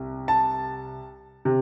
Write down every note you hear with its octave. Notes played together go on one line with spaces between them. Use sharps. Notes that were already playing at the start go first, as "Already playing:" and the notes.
Already playing: C2
A5
C3